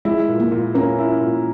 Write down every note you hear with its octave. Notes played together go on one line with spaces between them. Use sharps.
G#3 E4
A#2
A#3
A#2
A#3 C#4
E4
A#2